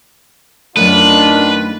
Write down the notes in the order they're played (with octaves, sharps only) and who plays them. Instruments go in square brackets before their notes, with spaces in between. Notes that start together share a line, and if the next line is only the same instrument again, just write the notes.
[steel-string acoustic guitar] F#2 A3 [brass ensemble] D#3 D4 F4 [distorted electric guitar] B4